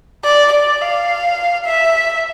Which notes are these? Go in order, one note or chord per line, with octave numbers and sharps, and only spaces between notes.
D5
D5
F5
E5